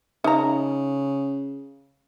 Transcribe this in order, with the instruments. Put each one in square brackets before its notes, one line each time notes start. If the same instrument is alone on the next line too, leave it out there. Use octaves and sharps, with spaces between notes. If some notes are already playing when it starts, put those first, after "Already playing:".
[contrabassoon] C#3 [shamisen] D#4 A#5